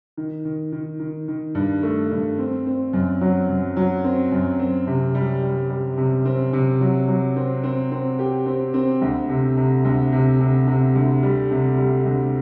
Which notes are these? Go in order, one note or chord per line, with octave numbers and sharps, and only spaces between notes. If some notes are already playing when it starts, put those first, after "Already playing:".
D#3
D#3
D#3
D#3
D#3
G2
A3
G2
C4
C4
F#2
F#3
F#2
F#3
C4
F#2
C4
C3
G3
G3
G3
C3
C4
C3
F#3
F#3
C4
C4
C4
G4
C4
C4
D2
C3
C3
D2
C3
C3
C3
D2
G3
C3
G3
D2